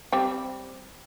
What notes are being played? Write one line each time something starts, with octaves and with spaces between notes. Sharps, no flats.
G3 C4 G5